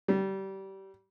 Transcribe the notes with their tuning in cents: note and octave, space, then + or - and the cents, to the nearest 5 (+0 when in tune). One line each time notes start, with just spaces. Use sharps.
G3 -25